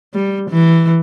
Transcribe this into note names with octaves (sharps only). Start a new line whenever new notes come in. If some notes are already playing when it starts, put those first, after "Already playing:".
G3
E3